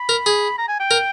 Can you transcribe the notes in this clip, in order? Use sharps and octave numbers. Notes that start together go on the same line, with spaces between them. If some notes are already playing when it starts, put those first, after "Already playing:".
Already playing: B5
A#4
G#4
A#5
G#5
G5
A#4